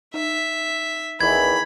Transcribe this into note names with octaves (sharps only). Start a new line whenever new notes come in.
D#4 E5
A1 E2 D#3 E3 B5 G#6